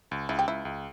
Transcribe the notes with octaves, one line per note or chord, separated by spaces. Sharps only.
C#2
C#2 E4
G4
C#2 E4
C#2